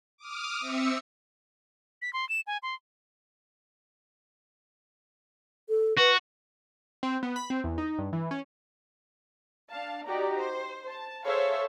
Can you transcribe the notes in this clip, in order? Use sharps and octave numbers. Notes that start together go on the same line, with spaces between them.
D6 D#6 F6
C4 E5 E6 C#7
B6
C6
E7
G#5
C6
A4
F#4 B4
C4
B3
B5
C4
E2
D#4
G2
E3
C#4
D4 F5 A5
D#4 F#4 G4 D5 A#5
C5
A5
G#4 A4 C5 C#5 E5 F5